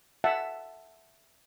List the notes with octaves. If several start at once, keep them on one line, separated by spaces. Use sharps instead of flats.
E5 F#5 A5